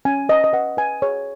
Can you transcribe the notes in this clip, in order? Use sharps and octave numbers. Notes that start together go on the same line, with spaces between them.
C#4 G#5
B4 D#5
D#5
B4 F#5
B4 G#5
G#4 C#5